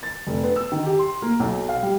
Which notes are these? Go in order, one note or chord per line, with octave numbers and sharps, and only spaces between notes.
A6
F1
B3
E6
D#3
G4
C6
A#3
B1
F5
G3